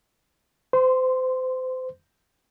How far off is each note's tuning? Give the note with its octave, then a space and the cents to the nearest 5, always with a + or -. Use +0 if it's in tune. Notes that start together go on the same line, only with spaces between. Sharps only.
C5 -30 C6 -5